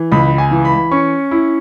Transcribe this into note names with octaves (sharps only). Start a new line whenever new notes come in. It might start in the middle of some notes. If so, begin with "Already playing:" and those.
Already playing: E3
C#2 B5
G#5
E3
B5
C#4 C#6
E4